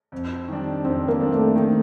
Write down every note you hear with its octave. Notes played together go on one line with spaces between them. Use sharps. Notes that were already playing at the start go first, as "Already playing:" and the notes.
F2
D#3 G3 D4
F2 C4
A#3
D#3 G3 D4
A3
D#3